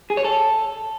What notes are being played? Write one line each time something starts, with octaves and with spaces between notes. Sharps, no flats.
G#4
C#5
A4